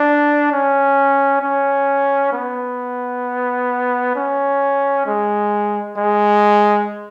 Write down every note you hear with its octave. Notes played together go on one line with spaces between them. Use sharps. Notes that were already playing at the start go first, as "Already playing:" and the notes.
Already playing: D4
C#4
C#4
B3
C#4
G#3
G#3